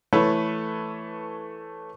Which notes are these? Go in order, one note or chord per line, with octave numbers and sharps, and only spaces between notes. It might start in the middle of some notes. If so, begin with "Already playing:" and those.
E3 A3 A4 B4 C#5